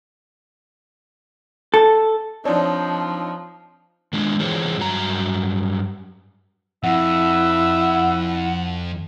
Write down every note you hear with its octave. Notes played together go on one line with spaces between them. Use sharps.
A4
F3 C4 D4 D#4 C#5 D5 A5 D#6
D#3 G#3 D4
D3 E3 F4 G#4 C5 C#5
G2 F#3 A#5
F2 E4 E5 F#5